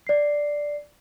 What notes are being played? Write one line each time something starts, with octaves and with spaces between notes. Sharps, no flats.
D5 C7